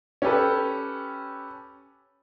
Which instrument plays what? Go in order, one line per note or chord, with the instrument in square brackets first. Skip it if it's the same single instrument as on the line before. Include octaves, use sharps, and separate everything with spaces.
[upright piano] C#4 G4 A4 B4